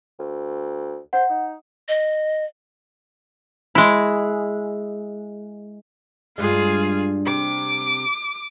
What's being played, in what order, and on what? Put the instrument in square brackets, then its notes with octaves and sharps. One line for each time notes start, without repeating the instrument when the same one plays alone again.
[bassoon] D2
[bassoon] C5 [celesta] F#5
[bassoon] D#4
[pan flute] D#5
[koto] G#3 E4
[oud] G2 G#3 [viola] F4 G#4
[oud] C3 C4 [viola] D6